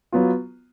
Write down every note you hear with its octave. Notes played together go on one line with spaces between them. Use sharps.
F#3 B3 F4